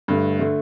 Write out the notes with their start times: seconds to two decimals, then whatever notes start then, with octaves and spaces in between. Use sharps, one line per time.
0.08 G2 D3 A3
0.39 D3 A3